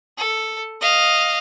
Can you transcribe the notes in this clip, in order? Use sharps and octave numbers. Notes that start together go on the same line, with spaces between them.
A4
D#5 F5